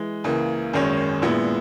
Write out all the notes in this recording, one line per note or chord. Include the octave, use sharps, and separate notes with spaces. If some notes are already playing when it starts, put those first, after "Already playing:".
Already playing: E3 G#3
C#2 C#3 E3 A#3
G#1 F#2 D#3 G#3 C#4
A#1 A#2 G#3 B3 E4